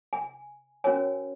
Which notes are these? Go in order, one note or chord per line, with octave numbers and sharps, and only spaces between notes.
G#5
C#4 F#4 A#4 C#5 G#5